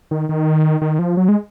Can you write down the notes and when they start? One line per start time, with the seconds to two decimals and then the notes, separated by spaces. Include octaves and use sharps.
0.11 D#3
0.29 D#3
0.82 D#3
0.99 F3
1.17 F#3
1.28 G#3